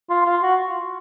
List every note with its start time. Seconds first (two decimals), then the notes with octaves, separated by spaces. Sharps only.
0.10 F4
0.26 F4
0.42 F#4